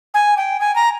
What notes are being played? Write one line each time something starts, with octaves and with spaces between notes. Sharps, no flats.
G#5
G5
G#5
A#5